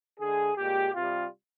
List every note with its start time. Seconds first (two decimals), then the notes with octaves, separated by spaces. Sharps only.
0.20 D3 G#3 G#4
0.58 A#2 G#3 G4
0.95 C3 G3 F4